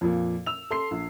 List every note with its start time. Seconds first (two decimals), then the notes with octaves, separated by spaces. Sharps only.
0.01 F2 A#2
0.46 E6 F7
0.70 A4 C6 C7
0.91 A#1